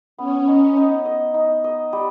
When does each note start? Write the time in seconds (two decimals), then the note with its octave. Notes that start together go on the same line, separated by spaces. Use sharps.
0.17 B3 C#4
0.48 D#4
0.77 D#4
1.05 D#5
1.34 D#4
1.64 D#5
1.93 G3